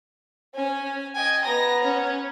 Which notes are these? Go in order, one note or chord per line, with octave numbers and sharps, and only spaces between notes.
C#4 G#5
D#5 G5 G#5
B3 A#5 A#6
C#4